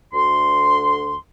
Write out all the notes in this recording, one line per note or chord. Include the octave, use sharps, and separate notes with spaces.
D2 C6